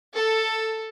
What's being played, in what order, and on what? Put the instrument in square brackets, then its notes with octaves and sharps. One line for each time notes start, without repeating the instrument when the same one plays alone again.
[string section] A4